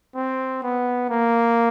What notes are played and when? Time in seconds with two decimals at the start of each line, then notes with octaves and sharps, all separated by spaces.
0.15 C4
0.63 B3
1.10 A#3